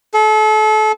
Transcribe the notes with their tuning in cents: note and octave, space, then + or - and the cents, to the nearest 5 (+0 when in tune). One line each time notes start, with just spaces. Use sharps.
A4 -35